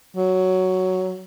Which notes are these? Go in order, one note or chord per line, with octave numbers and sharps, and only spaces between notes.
F#3